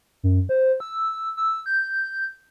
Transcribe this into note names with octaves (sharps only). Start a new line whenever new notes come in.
F#2
C5
E6
E6
G6